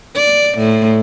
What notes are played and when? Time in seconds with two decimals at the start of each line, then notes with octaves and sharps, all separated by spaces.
0.16 D5
0.58 A2